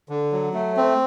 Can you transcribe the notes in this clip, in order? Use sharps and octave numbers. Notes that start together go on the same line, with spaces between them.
D3
F#3
A3
C4